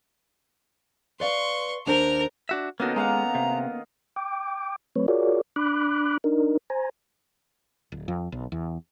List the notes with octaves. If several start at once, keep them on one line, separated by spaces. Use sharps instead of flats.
B4 D5 F5 C6 C#6
D#2 D4 A#4 C5 F6
D4 F#4 E5
D#3 A#3 B3 C#4 D#4 F#4 A4 A#4
G#3 A#3 F5 F#5 A#5
C3
G5 D6
F#3 A3 C4 B4 C#5
F4 F#4 G#4 A#4 C#5 D5
D4 B5 D6 F#6
D4 D#4 A#4
C5 G#5 A#5
D1
F2
B1
E2